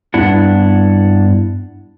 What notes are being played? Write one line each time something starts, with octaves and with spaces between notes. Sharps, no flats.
G2 B3 D4 E4 F#5